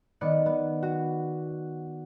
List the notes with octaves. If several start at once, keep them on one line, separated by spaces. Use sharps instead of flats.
D#3 B3 D5 F#6 C#7
B3
F#4